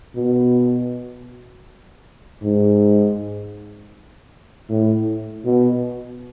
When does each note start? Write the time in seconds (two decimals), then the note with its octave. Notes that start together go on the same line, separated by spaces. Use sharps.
0.15 B2
2.42 G#2
4.69 A2
5.45 B2